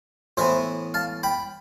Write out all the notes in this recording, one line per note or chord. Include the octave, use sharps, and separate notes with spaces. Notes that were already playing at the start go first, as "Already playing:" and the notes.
A2 E3 B3 C5 E5
F5 A5
G5 B5